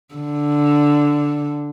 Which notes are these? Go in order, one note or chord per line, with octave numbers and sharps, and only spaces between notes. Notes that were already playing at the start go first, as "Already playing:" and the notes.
D3